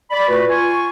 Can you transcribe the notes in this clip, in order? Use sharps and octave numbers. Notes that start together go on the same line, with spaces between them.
D5 B5
A#2 A3 F#4 B4
F4 G#5 C#6